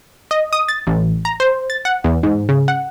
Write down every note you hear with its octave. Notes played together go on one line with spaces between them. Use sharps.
D#5
D#6
A6
A1
A#5
C5
A6
F#5
E2
G#2
C#3
F#5